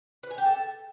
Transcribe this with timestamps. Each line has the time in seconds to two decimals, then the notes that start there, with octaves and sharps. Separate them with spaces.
0.23 B4
0.31 G#5
0.38 G4
0.45 A4